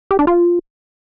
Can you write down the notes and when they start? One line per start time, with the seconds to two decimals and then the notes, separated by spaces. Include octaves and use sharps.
0.11 G4
0.19 D4
0.27 F4